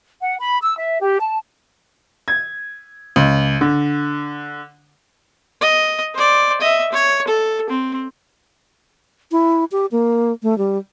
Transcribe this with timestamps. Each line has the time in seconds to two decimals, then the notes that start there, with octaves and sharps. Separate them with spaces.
0.22 F#5
0.41 B5
0.62 E6
0.78 E5
1.02 G4
1.20 A5
2.28 G#6
3.16 C#2
3.61 D3
5.61 D#5
6.15 C5 D5
6.61 D#5 E5
6.93 C#5
7.28 A4
7.70 C4
9.32 E4
9.72 G4
9.92 A#3
10.43 A3
10.58 G3